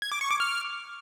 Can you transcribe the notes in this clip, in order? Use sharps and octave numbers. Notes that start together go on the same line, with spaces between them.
G#6
D6
C#6
D6
F6